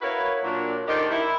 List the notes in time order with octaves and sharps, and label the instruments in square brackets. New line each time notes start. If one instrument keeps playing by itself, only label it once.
[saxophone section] E4 F#4 A#4 B4 C#5 F5
A#2 F#3 D4
D#3 D4 D#4 G4 A4 C5
E4